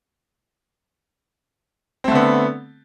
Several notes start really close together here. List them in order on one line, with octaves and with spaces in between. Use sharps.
C4 A3 D3 B3